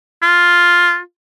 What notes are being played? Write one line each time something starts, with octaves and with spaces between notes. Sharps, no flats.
F4